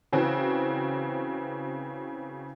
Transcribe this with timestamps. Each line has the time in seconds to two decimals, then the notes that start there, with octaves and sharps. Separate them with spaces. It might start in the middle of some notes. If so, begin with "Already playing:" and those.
0.13 C#3 E3 C4 F#4